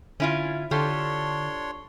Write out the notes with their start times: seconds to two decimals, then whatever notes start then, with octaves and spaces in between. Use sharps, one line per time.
0.20 D3 C#4 E4 F4
0.71 D3 D4 F4 G4 A4 C#5 C6